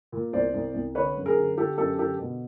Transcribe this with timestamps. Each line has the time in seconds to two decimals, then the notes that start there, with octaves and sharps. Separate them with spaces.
0.12 A#2
0.33 C2 C5 D5
0.54 C2
0.74 C2
0.95 D3 B4 C#5
1.16 F#2
1.26 G#4 A#4
1.36 D3
1.57 D3 G4 A4
1.77 F#2 G4 A4
1.98 D3 G4 A4
2.19 B2